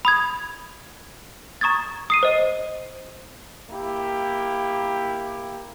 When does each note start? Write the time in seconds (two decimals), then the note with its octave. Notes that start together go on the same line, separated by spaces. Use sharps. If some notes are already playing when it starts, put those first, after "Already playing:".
0.05 B5 D#6 G#6
1.61 A#5 C#6 D#6 G#6 A6
2.10 D#6 C7 D#7
2.23 C5 D#5
3.70 A#3 E4 G4